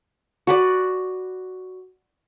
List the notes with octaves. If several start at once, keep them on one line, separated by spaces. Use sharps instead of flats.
F#4 B4 D5